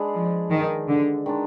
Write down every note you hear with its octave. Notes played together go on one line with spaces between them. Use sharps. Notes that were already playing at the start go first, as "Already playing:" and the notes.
Already playing: G#3 D4 G#4 B4
F3
D#3
D3
D#3 G#3 D4